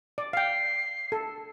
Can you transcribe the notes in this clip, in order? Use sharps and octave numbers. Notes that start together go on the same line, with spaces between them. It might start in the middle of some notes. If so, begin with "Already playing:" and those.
D5
F5 G5 C7
A4